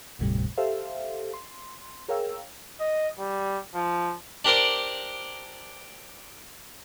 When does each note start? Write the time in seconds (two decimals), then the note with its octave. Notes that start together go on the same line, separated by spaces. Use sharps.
0.19 G1 D#2 A2 C3 G3
0.58 G4 A4 C5 E5 F5
1.34 C6
2.09 G#4 A#4 C#5 F5 G5 E6
2.80 D#5
3.19 G3
3.75 F3
4.45 D4 G4 A#4 C5 D5